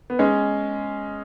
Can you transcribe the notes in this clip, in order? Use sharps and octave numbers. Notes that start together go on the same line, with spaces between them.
B3
G#3 C#4